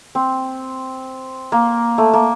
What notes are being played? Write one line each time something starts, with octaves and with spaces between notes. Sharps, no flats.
C4
A#3
A3
A#3